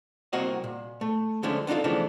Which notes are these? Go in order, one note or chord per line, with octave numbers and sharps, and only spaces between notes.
C2 A#3 C4 F#4 D#5 F#5
A#2
A3
D3 F3 G#3 A3 C#4 D4
B3 D4 D#4 F4 A4
C#3 E3 F3 A3 B3 D4